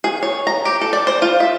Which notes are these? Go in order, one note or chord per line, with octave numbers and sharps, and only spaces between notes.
G#4
C#5
A#5
G4
A4
D5
C5
F4
E5